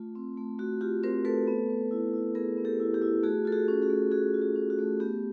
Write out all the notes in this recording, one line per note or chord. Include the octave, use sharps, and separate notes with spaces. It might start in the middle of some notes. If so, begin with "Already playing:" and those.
Already playing: A3 F4
C4
A3
A3 F#4
F4 G4
C4 A#4 C5
A3 A4 B4
B3
B3
E4
E4
B3 G#4 A#4
B3
G4 A4
E4
G4
E4
A3 F#4 G#4
F4 A4
F#4 G#4
C#4
F#4 G#4
A3
A3 F#4 G#4
F4
F#4
C#4
F#4
A3
B3 G4